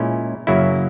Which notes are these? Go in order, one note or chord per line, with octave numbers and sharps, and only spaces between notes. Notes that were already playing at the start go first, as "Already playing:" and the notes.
Already playing: A#2 G#3 C#4 E4
F#2 C#3 F#3 A#3 E4